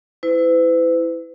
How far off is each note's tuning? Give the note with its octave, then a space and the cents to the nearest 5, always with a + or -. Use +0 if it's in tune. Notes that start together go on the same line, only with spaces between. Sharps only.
E4 -5 B4 +45